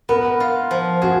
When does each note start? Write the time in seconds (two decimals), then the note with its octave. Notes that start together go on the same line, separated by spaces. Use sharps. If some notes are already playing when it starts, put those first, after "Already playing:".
0.09 B3 A#4
0.40 F4
0.71 F3
1.02 F#4 G#4